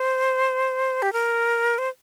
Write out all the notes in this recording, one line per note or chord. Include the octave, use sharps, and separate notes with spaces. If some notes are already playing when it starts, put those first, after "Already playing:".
Already playing: C5
G4
A#4
C5